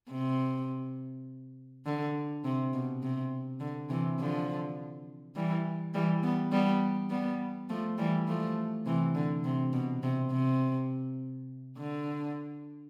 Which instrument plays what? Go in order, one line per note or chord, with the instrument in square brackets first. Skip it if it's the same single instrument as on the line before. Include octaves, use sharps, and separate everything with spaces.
[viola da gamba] C3
D3
C3
B2
C3
D3
C3 E3
D3 F3
E3 G3
E3 G3
G3 B3
G3 B3
G3 B3
F3 A3
E3 G3
F3 A3
C3 E3
D3
C3
B2
C3
C3
D3